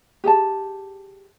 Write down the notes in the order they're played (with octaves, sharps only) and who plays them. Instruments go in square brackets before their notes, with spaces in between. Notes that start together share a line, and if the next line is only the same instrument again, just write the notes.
[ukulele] G4 G#4 G5 A5